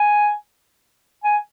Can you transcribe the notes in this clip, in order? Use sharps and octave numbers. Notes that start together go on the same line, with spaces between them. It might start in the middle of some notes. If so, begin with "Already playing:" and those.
Already playing: G#5
G#5